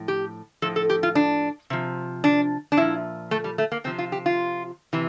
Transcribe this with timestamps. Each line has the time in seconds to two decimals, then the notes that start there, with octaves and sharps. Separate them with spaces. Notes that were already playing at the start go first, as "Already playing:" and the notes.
Already playing: A2 F3
0.08 G4
0.62 A2 F3 A4
0.76 A4
0.90 G4
1.03 F4
1.15 D4
1.70 C3 F3
2.24 D4
2.72 D4
2.77 A#2 F3 E4
3.31 A3
3.44 G3
3.58 A3
3.72 A#3
3.84 C3 F3 C4
3.98 F4
4.12 G4
4.26 F4
4.93 C3 E3